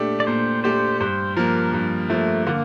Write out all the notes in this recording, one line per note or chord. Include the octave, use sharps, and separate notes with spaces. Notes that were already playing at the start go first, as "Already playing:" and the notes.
Already playing: A#2 A3 D4 G4
D5
A#2 C5
A3 D4 G4 C5
G2 C5
F3 A#3 A#4
G2
F3 A3 A#3
D3 A#3